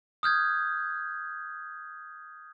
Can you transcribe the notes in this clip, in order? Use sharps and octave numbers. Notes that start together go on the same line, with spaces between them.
D#6 F6 G6 G#6